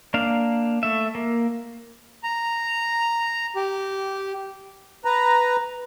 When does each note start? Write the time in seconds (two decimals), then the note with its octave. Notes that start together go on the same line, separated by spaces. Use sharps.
0.14 A#3 D4 F5
0.83 A3 E5
1.15 A#3
2.23 A#5
3.56 G4
5.05 B4 A#5